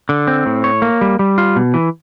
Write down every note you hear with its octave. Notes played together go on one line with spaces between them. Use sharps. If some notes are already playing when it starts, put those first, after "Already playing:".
D3
C4
A2
C#5
A#3
G3
G3
F4
B2
E3